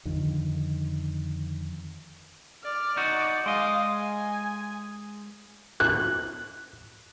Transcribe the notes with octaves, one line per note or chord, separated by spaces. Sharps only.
F2 D3 D#3
D5 F6
D#4 F#4 D5
G#3 D#5 F5
G#5
F#6